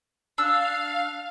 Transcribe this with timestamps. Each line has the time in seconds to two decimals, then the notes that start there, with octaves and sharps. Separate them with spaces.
0.38 D4 F5 E6